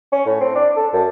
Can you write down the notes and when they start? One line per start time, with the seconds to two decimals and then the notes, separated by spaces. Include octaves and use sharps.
0.12 C#4
0.26 A2
0.41 C4
0.55 D4
0.77 A4
0.93 F#2